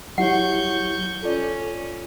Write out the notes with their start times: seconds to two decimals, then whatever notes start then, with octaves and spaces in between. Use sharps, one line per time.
0.18 F#3 E4 G4 C#5 F#5 C#6 G6
1.23 C#4 F4 A4 D5